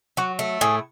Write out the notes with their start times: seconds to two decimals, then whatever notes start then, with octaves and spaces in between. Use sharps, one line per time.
0.17 F#3 F#4
0.39 A3
0.61 A2 G#4